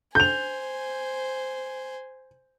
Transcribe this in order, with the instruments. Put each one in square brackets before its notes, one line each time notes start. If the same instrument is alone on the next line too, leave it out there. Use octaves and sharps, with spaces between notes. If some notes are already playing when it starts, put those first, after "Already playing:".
[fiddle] C5 G#5 [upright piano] G6 F7